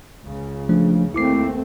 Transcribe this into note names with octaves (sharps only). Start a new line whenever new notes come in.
C#2 C#3
F3 A3 D4
D#2 A3 C4 E4 D6 C7